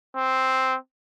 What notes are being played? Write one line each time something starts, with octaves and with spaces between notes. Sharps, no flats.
C4